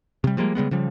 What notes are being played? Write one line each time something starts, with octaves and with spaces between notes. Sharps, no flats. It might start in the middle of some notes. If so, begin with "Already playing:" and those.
C3 G3
F3 G3 G#3 A#3
C#3 G3 G#3 B3
C#3 F3 G3